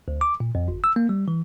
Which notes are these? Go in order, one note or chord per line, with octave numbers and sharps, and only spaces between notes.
D2
D6
A#2
F2
G1
E6
A#3
G3
E3